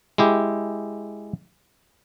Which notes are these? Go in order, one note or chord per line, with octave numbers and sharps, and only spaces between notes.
G#3 E4 G4